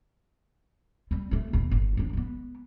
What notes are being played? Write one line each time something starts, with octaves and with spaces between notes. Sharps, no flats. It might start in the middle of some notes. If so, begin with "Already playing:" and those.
G3 C4
G#3 A3
D#2 B2
G1
D#2 D4
G#3 B3